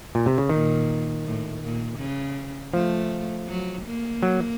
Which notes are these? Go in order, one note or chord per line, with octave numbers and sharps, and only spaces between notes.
A#2
C3
C#3
A#2 D#3
A2
A#2
C#3
F3 A3
F#3
A#3
F#3